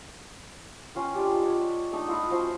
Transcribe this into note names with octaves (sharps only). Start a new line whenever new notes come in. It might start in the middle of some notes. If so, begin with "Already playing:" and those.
C#4 F4 G5
G#3 D4 F4 G4
C#5 D5 F#5
A3 D4 D#4
E4 F4 D#5 F#5
F3 C#4 F#4 C5